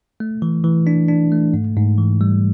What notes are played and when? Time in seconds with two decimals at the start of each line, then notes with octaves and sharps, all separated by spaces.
0.20 A3
0.42 E3
0.64 E3
0.87 D4
1.08 D4
1.32 A3
1.54 G#2
1.76 G#2
1.98 E3
2.21 G3